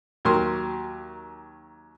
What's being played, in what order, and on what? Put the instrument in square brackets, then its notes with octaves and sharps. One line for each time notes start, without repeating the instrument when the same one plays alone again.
[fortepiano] D#2 F#3 A#4 C6